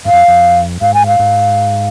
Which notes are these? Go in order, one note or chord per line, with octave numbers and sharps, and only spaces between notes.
G#2 F5
F2
F2
G#2 F5
G#5
F5
G#2